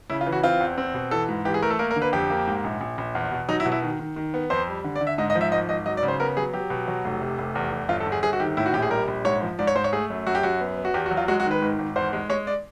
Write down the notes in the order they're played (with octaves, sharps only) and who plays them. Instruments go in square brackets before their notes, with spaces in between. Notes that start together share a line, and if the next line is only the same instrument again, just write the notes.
[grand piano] C#3 E4
F4
E3
F#4
C4 F4
E2
C4
B2
E3 A4
G#2
E3 G4
G#4
A3 A#4
A4
A#3 A#4
A#4
D3
B4
F2 G4
A#3
G#2
A#1
A#1
A#1
E2
B2
F#3 D#4
E4
B2
E4
D#3
D#3
D#3
B3
F2 C5
G3
D3
D5
D3
E5
G#2 D#5
D#5
F3
E5
G#1 D#5
G#1 D#5
F#3 D#5
D5
C#3
C5
B3 A#4
F#3 G#4
F#3 G4
B2
F#3
F1
C3
F1
E2
E2
G1 F4
A4
G1
G#4
G1 G#4
F#4
D#3 G4
A2 E4
F#4
A#1 G4
G#4
G3 A#4
A#1
G#2 C#5
F3
G#2 D5
C#5
G#2 C5
C#5
A3 G#4
F#2
F#2 F#4
G4
F#2 F#4
B3
B3
F#4
E2 G4
F#4
F#3
F4
G#3 F#4
F#4
D#3
B4
G#1
G#1
E2 C5
G#3
G#3 C#5
D5